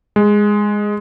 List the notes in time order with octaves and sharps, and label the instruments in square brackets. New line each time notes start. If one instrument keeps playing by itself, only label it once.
[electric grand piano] G#3